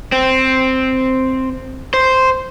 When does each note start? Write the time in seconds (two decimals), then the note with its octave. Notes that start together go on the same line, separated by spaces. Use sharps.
0.12 C4
1.94 C5